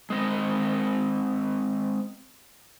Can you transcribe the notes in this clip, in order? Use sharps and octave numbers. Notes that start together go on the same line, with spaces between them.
G#3 C4 D#5